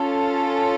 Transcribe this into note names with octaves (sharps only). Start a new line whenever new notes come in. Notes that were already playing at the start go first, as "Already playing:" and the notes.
Already playing: C#4 F4 A4